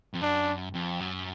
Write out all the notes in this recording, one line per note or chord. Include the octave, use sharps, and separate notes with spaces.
F2
F#2 D4
F2
F#2